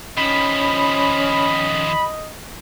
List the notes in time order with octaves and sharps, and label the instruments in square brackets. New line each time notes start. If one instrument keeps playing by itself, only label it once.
[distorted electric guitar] D#3 F3 [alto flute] C#4 [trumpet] D#5 [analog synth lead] B5